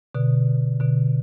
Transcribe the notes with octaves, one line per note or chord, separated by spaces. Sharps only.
B2 D3
B2 D3